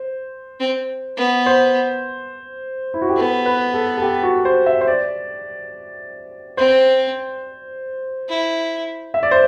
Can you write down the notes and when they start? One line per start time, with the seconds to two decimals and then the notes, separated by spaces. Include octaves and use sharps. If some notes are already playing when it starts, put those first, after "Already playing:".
Already playing: C5
0.60 C4
1.18 B3
1.46 C5
2.94 E4
3.02 F#4
3.09 G4
3.16 B3 A4
3.46 B4
3.74 A4
3.98 A4
4.02 G4
4.23 F#4
4.45 C5
4.66 E5
4.81 C5
4.87 D5
6.57 C4 C5
8.29 E4
9.14 E5
9.23 D5
9.31 C5